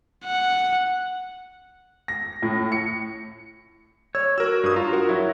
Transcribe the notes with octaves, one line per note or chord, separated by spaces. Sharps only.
F#5
A#6
A2
C#7
C#5 E6
F#4 A#4 E6
G2 D#6
F4 A#5
F#4 A#4
F#3 E4